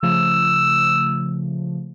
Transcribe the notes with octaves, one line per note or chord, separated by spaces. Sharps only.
C#3 F3 A3 E6